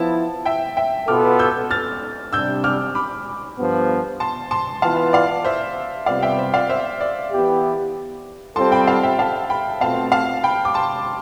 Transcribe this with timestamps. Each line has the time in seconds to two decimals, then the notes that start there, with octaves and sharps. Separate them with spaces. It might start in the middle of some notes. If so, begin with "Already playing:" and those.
Already playing: F3 B3 E4 A5
0.45 E5 G5
0.77 E5 G5
1.08 B2 B3 F4 A4 D6 F6
1.39 E6 G6
1.71 F6 A6
2.33 C3 G3 D4 E6 G6
2.64 D6 F6
2.95 B5 D6
3.58 G2 F3 B3
4.20 A5 C6
4.51 A5 C6
4.82 E3 B3 F4 B4 F5 A5
5.13 D5 F5
5.44 C5 E5
6.06 C3 G3 B3 F4 D5 F5
6.22 E5 G5
6.38 C5 E5
6.54 D5 F5
6.69 C5 E5
7.01 D5
7.32 E3 B3 E4 G4
8.56 G3 C4 F4 A4 A5 C6
8.72 G5 B5
8.87 F5 A5
9.03 E5 G5
9.19 F5 A5
9.50 G5 B5
9.81 B2 A3 C4 F4 F5 A5
10.12 F5 A5
10.43 G5 B5
10.65 D6
10.74 A5 C6